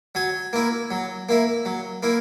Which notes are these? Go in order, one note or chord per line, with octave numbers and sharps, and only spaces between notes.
F#3 G#5
A#3 E4
F#3
A#3 E4
F#3
A#3 E4